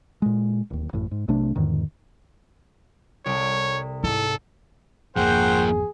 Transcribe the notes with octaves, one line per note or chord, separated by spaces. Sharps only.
A#2 G#3
D1 D#2
A1 F#2 A2
G#2
B1 C3 A3 D4
E2 G#2 D3 D#3
C2 A4 C#5 D7
G#2 E4 A4 D#7
G#1 F2 F3 A#3 G#4 C5 F#5 G5